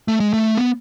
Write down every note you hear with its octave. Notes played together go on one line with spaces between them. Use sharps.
A3
G#3
A3
B3